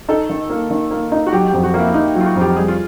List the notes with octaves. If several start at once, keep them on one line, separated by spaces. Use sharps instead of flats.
D#4 A4
D#3
A#3
D#3
A#3
D#4
F#4
F#3 G4
G4
F2
F#4
A#3 E4
E4
A#3 D#4
F#3
F4
F#4
F2
G4
G3 G#4
F4